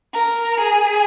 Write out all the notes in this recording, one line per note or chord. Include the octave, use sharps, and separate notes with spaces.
A#4
G#4